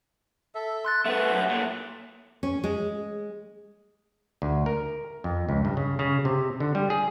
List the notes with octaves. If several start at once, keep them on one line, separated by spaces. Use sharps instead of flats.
A4 E5
C6 F#6 A6
A3 B3 E5 F#5
F#2
A#2 A3
C#4
G#3
D2
A#4
F2
C#2
G2
C#3
C#3
C3
D3
G3
G#4